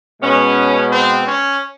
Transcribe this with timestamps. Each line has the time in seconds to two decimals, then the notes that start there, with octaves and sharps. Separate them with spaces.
0.21 B2 G#3 B3 C#4
0.90 C4
1.25 C#4